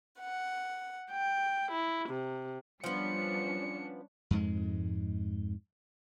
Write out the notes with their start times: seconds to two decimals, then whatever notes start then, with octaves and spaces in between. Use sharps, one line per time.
0.20 F#5
1.11 G5
1.72 E4
2.10 C3
2.84 F3 G3 B3 C#4 D4 C#7
4.31 F2 G#2 G#3